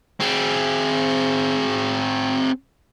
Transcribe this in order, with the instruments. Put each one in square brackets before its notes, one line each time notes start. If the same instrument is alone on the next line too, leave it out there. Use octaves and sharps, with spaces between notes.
[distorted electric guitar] C4 G#4